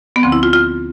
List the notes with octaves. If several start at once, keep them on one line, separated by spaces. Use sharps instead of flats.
B3
D2 D3 F3 C4
E4
F4
F4